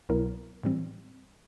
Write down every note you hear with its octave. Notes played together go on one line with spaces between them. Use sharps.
C2 B2 F#3 B3 E4 A#4
A2 E3 G3 C4